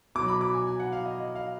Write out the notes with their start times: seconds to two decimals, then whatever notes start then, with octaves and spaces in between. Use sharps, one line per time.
0.15 B2 F#3 D6
0.28 B5
0.41 D6
0.54 G#5
0.67 G#5
0.80 F#5
0.92 F5
1.05 D#5
1.18 D#5
1.35 F5